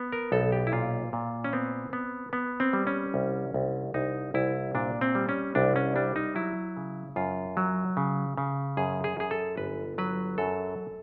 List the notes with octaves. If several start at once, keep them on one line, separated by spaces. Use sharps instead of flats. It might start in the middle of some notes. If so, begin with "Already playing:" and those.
Already playing: B3
A#4
B1 A4
G4
E4
A#2 F4
A#2
C#4
B3 C4
B3
B3
C4
G3
C#4
C2
C2
C2 D#4
C2 E4
A#2 D4
C4
G3
C#4
C2 D4
C#4
G3 D4
D#4
F#3 E4
C#3
F#2 F4
F#3
C#3
C#3
F#2 G#4
G#4
F#2 G#4
A4
G1 B4
F#3 B4
F#2 A4